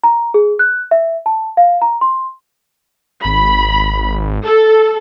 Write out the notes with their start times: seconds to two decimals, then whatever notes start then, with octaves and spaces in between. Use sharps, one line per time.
0.03 A#5
0.34 G#4
0.59 F#6
0.91 E5
1.26 A5
1.57 F5
1.82 A#5
2.01 C6
3.25 G#1 B5
4.45 A4